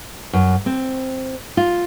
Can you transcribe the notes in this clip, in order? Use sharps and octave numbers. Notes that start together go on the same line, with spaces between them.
F#2
C4
F4